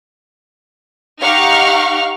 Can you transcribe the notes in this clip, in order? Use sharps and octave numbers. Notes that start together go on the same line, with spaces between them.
D#4 G4 F5 F#5 C#6 F6